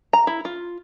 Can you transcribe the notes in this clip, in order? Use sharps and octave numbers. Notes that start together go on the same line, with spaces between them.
A#5
E4
F4